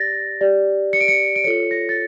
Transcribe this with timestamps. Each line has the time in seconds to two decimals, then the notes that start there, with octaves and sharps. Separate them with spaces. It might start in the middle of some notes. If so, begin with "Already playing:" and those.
Already playing: G4 D5 A6 A#6
0.41 G4 D5
0.93 C#7
1.01 D7
1.08 C#7
1.36 D7
1.44 F4 A4 C#5 C#7
1.71 A#6
1.89 A6